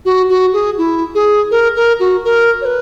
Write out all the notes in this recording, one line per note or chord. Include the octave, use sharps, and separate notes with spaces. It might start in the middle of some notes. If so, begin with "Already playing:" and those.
F#4
F#4
G#4
E4
G#4
A#4
A#4
F#4
A#4
C#5
B4